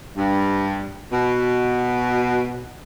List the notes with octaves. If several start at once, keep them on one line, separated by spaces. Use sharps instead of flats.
G2
B2